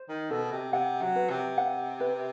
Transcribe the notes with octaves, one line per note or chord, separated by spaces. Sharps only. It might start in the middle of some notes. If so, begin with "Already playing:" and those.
Already playing: C5
D#3
B2 A4
C3
C3 F#5
F#3
B4
C3
F#5
B4